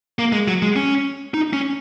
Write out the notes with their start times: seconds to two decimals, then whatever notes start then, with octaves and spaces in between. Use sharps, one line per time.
0.19 A#3
0.32 G#3
0.48 F#3
0.62 G#3
0.76 C#4
1.34 D#4
1.53 C#4